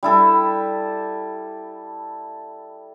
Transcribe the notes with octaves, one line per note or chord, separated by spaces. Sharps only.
G3 E4 A4